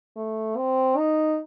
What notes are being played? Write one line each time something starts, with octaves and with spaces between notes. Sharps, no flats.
A3
C4
D#4